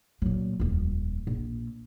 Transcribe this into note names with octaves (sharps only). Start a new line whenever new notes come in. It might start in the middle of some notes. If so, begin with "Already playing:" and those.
A#2 F#3
D#1 F2
A#1